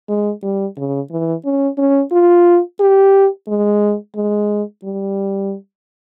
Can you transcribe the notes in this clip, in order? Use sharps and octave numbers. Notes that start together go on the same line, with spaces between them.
G#3
G3
C#3
E3
C#4
C#4
F4
G4
G#3
G#3
G3